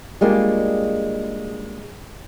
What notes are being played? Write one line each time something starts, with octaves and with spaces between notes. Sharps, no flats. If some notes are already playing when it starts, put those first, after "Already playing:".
G3 G#3 A#3 D4 F4 G4